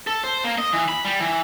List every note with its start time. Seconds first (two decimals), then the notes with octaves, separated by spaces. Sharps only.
0.07 A4
0.24 C5
0.44 A#3
0.58 D#5
0.73 E3
0.89 B5
1.05 G3
1.20 E3